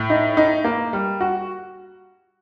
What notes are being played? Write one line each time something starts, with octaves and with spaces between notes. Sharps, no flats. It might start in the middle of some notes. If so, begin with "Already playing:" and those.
Already playing: A2
D#4
D#4
A#3
G3
F#4